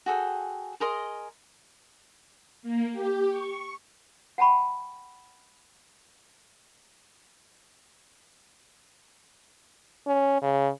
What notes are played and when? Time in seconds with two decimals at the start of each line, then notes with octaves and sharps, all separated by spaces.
0.06 F#4 G#4 A4 G5
0.80 G#4 A#4 D#5 C6
2.63 A#3
2.92 G4
3.29 C#6
4.38 F#5 G5 A5 B5 C#6
10.07 C#4
10.42 C#3